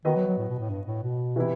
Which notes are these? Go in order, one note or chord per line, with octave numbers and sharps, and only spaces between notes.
D#3 B3 F#4 B4 D#5
F#3
F#3
A2
B2
A2
G2
A2
B2
C3 E3 B3 E4